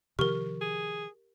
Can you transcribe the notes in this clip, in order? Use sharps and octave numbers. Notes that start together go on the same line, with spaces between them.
C3 D#3 F3 G4 A#4 C#6
G#4